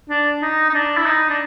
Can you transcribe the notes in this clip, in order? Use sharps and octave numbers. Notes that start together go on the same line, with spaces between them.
D4
D#4
D#4
D4
E4
D#4
D4